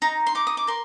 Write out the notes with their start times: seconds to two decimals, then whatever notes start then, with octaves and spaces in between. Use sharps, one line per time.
0.02 D#4 A#5
0.27 C6
0.35 D#4 D6
0.47 D#6
0.57 D6
0.67 A#4 C6